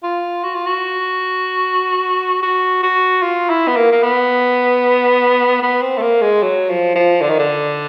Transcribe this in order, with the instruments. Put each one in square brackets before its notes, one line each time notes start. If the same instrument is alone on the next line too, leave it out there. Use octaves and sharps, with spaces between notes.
[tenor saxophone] F4
F#4
F4
F#4
F#4
F#4
F4
E4
B3
A#3
A#3
B3
B3
C4
A3
A#3
G#3
F#3
F3
F3
D3
D#3
D3